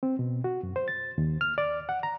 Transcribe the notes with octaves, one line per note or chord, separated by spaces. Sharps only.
C4
B2
F#4
F#2
C5
A6
D#2
F6
D5
F#5
A#5